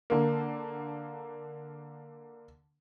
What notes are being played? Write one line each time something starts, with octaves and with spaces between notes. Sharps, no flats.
D3 A#3